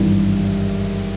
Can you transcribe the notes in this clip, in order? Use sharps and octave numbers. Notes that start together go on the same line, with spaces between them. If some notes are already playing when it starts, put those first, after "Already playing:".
Already playing: G#1 G2 E3 G3